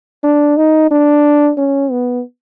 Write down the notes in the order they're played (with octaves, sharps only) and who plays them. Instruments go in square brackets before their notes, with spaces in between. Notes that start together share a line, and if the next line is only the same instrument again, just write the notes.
[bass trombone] D4
D#4
D4
C#4
B3